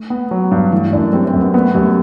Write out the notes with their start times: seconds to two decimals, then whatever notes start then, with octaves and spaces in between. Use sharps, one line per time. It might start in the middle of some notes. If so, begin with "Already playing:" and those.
Already playing: A3
0.10 B3
0.31 F#3
0.51 G2
0.72 E3 A3
0.93 F#2 D4
1.13 G3 C4
1.27 C4
1.33 F#2
1.40 B3
1.54 A3 B3
1.74 F#2 G3